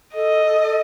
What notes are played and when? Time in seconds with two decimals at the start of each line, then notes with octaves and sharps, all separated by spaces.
0.14 A4 D#5
0.46 A4
0.61 A4